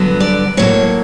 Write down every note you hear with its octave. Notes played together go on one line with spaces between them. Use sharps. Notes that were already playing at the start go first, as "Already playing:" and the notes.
Already playing: G2 D3 F#3 B3
D5
A2 F#3 A#3 C#5